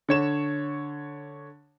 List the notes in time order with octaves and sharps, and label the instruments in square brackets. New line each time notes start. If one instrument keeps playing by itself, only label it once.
[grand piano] D3 C#5 E7